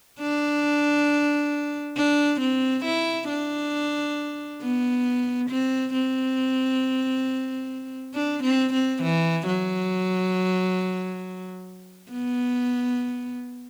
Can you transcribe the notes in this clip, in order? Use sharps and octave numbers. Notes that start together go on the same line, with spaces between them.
D4
D4
C4
E4
D4
B3
C4
C4
D4
C4
C4
E3
F#3
B3